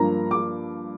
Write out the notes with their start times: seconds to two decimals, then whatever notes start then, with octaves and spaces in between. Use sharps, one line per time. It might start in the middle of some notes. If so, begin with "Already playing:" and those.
Already playing: G2 F3 A#3 A#5
0.31 D6